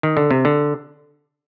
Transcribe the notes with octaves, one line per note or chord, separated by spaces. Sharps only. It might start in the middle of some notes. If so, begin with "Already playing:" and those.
D#3
D3
C3
D3